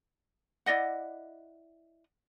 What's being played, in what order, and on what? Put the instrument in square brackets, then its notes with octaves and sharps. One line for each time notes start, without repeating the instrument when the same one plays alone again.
[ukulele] E4 D5 D#5 F#5